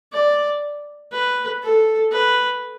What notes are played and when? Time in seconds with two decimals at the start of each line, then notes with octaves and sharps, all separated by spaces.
0.12 D5
1.12 B4
1.62 A4
2.12 B4